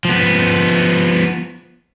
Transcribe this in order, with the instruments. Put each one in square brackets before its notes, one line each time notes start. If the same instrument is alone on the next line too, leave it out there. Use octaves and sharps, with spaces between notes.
[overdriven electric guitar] F3 B3